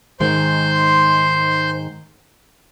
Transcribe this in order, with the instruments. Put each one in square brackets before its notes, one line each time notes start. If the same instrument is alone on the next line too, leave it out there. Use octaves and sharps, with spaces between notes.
[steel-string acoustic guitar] G#2 D#3 G#3 [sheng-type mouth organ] C5 C6